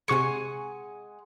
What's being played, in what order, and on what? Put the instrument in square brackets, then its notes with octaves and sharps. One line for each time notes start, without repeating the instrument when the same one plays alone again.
[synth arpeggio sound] C3 C#6 C#7 [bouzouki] G#3 F#5 G#5